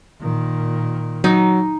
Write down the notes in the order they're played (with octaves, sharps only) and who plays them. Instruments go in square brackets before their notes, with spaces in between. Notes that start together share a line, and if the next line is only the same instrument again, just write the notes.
[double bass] A#2 D#3
[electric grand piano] F#3 [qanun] D#4